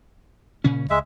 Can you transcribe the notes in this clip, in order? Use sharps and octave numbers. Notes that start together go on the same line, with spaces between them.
A#2 C#3 C#4
C#2 G#3 E5